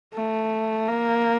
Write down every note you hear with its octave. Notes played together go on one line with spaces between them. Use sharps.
A3
A#3